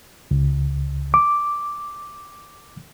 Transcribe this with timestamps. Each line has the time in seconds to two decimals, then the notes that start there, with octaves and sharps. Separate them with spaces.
0.31 C#2
1.14 D6